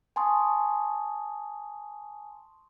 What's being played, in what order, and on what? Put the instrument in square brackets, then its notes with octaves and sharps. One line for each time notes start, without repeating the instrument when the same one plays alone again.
[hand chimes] G#5 A5 C6 C#6 D#6